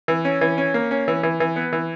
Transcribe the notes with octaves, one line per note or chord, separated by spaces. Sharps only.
E3
C#4
E3
C#4
A#3
C#4
E3
E3
E3
B3
E3